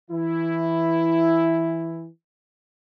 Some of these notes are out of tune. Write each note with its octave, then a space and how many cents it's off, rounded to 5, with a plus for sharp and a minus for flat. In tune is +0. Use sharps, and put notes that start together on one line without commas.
E3 +0 E4 +5